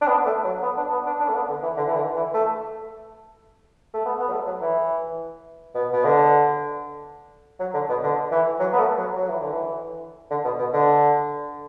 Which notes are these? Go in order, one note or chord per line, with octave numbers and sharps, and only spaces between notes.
D4
B3
A3
F#3
B3
D4
B3
D4
D4
A3
B3
D3
E3
D3
E3
D3
E3
A3
A3
B3
B3
F#3
A3
F#3
E3
B2
B2
D3
F#3
D3
B2
D3
E3
F#3
B3
A3
F#3
F#3
E3
D3
E3
D3
B2
B2
D3